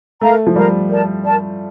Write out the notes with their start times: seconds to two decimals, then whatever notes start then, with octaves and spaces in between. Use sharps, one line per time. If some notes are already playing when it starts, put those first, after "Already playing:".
0.21 A3 A#4 F5 A#5
0.47 F3
0.56 G3 A#4 F5 A#5
0.89 A#4 D5 A5
1.24 A#4 D5 A5